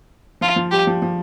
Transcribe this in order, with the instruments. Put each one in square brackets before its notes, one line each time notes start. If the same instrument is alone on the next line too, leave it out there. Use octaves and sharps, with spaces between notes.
[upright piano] F3 [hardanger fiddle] F4
[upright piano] F3
[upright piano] G3 [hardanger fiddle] G4
[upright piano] F3
F3